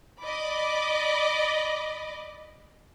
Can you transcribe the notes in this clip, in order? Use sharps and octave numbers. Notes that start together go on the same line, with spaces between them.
D5 D#5 B5 D6